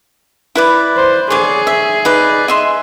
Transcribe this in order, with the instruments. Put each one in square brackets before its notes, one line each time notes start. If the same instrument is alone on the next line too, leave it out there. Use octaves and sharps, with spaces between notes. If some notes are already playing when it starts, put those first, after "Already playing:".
[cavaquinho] E4 B4 D5
[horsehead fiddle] C5
[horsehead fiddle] G#4 [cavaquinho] C#5 D5
[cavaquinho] E5
D#4 B4 D5
D#5 E5 C6